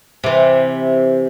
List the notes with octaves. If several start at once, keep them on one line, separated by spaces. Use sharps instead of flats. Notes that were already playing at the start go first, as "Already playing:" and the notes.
C3 E3